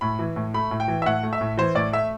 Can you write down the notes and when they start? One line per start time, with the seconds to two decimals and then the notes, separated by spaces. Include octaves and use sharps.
0.01 A2 B5
0.19 E3
0.36 A2
0.54 A3 B5
0.71 A2
0.80 G5
0.88 E3
1.02 E5
1.06 A2 F#5
1.23 A3
1.33 E5
1.41 A2
1.57 E3 C5
1.75 A2 D5
1.93 A3 E5